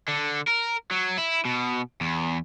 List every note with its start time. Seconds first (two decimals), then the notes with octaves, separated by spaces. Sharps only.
0.08 D3
0.48 A#4
0.91 F#3
1.18 E4
1.45 B2
2.01 E2